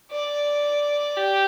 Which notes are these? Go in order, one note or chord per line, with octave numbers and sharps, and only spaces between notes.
D5
G4